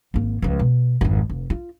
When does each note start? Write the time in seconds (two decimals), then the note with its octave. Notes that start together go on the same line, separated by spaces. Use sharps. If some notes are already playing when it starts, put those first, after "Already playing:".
0.14 G#1 A#3
0.42 C#2 F3
0.59 B2
1.01 G#1 F2
1.29 F1
1.50 F4